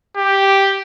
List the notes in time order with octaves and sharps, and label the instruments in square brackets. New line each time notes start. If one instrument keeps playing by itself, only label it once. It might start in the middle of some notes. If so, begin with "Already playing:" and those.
[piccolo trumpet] G4